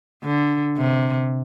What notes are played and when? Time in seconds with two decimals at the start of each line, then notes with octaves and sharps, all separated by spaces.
0.23 D3
0.77 C3